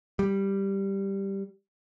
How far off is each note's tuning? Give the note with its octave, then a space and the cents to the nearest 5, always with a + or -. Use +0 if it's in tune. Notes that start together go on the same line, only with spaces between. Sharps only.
G3 +0